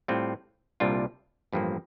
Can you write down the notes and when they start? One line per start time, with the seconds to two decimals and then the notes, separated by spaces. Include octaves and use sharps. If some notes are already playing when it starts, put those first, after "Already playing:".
0.08 A2 G3 C4 F4
0.80 C2 A#2 G3 D4 F4
1.53 A1 G2 F3 A#3